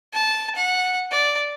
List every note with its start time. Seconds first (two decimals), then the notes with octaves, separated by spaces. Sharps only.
0.13 A5
0.56 F#5
1.11 D5